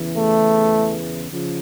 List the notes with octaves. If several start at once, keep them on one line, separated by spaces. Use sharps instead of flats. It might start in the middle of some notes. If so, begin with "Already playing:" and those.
Already playing: E2 C#3 E3
A3
C#3 F3